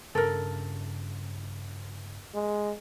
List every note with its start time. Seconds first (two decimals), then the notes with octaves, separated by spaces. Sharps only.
0.15 G2 C#3 A4 A#4
2.35 G#3